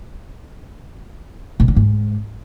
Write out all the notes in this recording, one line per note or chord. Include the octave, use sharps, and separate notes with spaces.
B2
D3
G#2